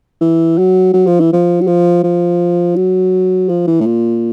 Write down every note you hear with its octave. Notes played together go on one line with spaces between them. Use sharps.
E3
F#3
F#3
F3
E3
F3
F#3
F3
F3
F#3
F3
E3
A2
A#2